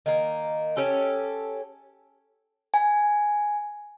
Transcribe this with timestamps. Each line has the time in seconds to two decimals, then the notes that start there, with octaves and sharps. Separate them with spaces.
0.06 D#3 A#3
0.77 C#4 G4 A4
2.74 G#5